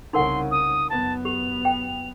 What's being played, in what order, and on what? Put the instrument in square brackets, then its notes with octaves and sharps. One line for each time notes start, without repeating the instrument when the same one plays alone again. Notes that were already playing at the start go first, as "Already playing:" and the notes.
[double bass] C2 C#3 [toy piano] D#4 A#4 F#5 [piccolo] C6
[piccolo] D#6
[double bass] F#2 B3 [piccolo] A5
[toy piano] G4 [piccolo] F7
[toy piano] G5